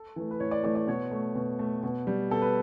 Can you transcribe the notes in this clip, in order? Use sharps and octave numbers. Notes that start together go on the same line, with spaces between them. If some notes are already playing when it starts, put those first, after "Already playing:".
Already playing: A4
E3 A3
B4
A2 C#5
D5
E3 A3 D5
D5
B2 C#5
A3
B2
A3
B2
G3
B2 A4
B4